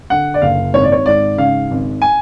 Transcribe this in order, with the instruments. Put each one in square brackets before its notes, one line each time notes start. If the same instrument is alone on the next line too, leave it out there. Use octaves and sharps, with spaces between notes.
[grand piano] D3 F#5
D5
F#1 F5
G#1 C#5
D5
C#5
G#2 D5
C#3 F5
G#1
G#5